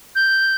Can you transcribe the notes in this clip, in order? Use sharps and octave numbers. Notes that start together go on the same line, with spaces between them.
G6